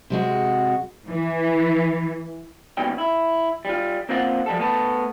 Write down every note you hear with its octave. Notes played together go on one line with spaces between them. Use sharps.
C3 G#3 F#4
E3
D#2 G#2 B2 G3 C#4 G5
E4
G3 F4
A#3 C4 F4 F#5
F3 G3 A4
A3 B3 A5